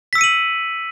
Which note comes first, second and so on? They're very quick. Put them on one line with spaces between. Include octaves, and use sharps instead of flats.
B6 E6 C#7 D#7 F#7